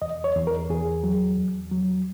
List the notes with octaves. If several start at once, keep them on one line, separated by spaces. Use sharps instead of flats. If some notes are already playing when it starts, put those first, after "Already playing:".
E2 D#5
C#5
E2
A#4
E2 G#4
F#3
E2
F#3